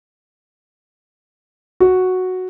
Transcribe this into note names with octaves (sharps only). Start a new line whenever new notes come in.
F#4